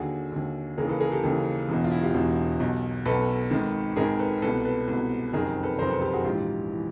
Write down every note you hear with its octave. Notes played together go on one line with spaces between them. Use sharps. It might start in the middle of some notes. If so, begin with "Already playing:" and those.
Already playing: D#2 D3 F#4 G#4
D#2 D3
D#2 C#3 E3 G#4 A#4
A4 B4
G#4 A#4
G4 A4
D#2 C#3 E3
E1 E2 B2
F4
E4 F#4
F4 G4
E1 E2 B2
B1 B2
B1 B2 A4 B4
G#1 G#2 D#3
G#1 G#2 D#3 G#4 A#4
A4 B4
C2 B2 A4 B4
A4 B4
C2 B2
F#1 F2 C3 D#3 G#4 A#4
A4 B4
F#1 F2 C3 D#3 A#4 C5
A4 B4
G4 A4
F#4 G#4
A#1 G#2 E3 F4 G4
E3